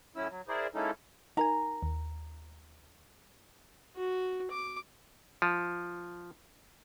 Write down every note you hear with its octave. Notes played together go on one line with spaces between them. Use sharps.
A2 F#3 C#4 E4 E6
F#3
E4 G#4 A#4 C5 D5
G#3 A#3 C#4 D#4 E4 A4
D#4 A#4 G#5 A#5
D#2
F#4
D6
F3